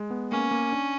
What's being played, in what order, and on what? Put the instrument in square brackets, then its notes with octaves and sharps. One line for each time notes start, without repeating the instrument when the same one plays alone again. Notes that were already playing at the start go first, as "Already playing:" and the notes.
Already playing: [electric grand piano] G#3
B3
[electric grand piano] A#3 [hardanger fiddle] C#4
[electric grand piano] A#3
D4